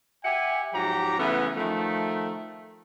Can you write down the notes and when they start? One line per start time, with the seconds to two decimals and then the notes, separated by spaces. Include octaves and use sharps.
0.24 G4 E5 F#5 G#5
0.73 G#2 F3 F#3 G4 A#5
1.19 C#3 E3 A3 B3
1.57 D#3 F3 A3